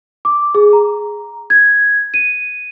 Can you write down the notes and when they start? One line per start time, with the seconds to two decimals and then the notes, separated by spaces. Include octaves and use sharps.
0.25 D6
0.55 G#4
0.73 A#5
1.50 G#6
2.14 D#7